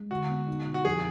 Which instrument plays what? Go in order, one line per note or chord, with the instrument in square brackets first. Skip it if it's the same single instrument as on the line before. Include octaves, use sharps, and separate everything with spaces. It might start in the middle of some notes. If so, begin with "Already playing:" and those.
Already playing: [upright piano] G#3
[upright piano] D3 [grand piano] F#4
[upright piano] B3
D#4
B2
[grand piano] F#4
[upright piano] F2 [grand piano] G#4